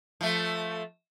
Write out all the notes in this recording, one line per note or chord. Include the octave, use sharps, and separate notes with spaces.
F3 A3